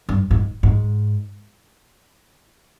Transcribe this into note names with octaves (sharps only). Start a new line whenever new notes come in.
G2
G#2
G#2